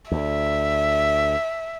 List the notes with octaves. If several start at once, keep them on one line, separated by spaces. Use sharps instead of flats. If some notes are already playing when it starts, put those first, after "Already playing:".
D2 E5